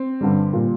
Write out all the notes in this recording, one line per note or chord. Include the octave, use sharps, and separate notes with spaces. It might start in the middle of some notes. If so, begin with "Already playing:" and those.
Already playing: C4
G2 D3 G3
A#2 G3